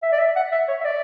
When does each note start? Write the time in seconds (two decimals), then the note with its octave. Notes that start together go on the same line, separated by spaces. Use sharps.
0.03 E5
0.12 D5
0.19 E5
0.36 F#5
0.52 E5
0.68 C#5
0.81 E5
0.85 D5